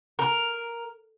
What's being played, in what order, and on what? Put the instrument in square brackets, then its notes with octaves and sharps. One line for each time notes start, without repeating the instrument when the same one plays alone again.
[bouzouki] A#4